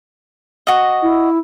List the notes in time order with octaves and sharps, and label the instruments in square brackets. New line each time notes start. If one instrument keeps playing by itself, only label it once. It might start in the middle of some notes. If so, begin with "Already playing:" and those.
[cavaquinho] F#4 D#5
[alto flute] E4